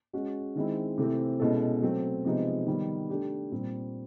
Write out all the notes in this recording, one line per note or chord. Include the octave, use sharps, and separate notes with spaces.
G#3 C#4 F#4
D#3 G#3 C4 E4
C3 E3 A3 C4
B2 G#3 C#4 E4 A4
F#3 A3 C4
C3 F3 G#3 B3 D#4
D#3 G3 B3
A3 D4 G4
A#2 G3 C4